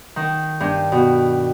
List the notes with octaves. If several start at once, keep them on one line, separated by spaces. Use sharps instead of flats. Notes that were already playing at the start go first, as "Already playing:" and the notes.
D#3
G2
B2